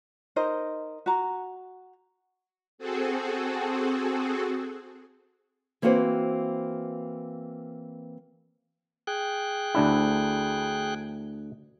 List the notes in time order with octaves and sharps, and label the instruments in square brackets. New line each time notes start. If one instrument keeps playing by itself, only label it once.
[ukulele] D#4 A#4 C5 D#5
F#4 A#5
[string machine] C4 F#4 G#4 A4
[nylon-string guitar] E3 A#3 C4 F#4 B4 C5
[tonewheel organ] G#4 G5 F#6
[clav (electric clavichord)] D2 D4 E4